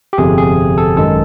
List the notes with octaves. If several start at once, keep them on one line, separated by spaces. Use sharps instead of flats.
G4
G1 F2 C3 G#4
G#4
A4
G#1 F#2 D#3 G#3 A4